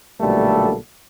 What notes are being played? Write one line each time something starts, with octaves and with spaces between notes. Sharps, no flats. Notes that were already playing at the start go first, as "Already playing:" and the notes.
B1 A#2 D3 G3 A3 A4